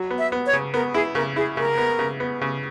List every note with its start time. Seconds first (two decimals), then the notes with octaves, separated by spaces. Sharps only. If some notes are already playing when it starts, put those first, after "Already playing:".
Already playing: F#3
0.10 B3
0.18 E5
0.32 B3
0.46 C#5
0.53 C#3
0.74 B3 A#4
0.94 E4 G#4
1.15 C#3 A#4
1.36 E4 G#4
1.57 C#3 A#4
1.78 B3
1.99 C#3
2.20 B3
2.41 C#3